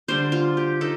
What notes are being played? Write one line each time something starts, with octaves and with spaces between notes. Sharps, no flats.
D3 G3 D4 C5
F4
G4
D#4 A4